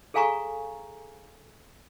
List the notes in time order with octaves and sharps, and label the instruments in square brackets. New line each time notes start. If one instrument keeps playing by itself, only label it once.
[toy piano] G#4 A4 F5 G#5 A#5 C#6